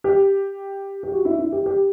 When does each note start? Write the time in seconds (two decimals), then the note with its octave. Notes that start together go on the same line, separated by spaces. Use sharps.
0.04 G4
1.03 G4
1.12 F#4
1.25 E4
1.39 E4
1.52 G4
1.66 G4